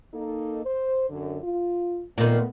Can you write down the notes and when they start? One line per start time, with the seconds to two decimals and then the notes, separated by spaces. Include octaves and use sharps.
0.14 A#3 D#4 A4
0.65 C5
1.09 F#2 D3
1.42 F4
2.18 A#2 D#3 A3 B3